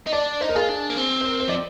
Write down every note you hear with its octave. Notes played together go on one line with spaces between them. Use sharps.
D#4
D4 D5
D#4 C5
A#4
F4 G#4
D4
A#3
C4
C5
A#4
C5
F3 D5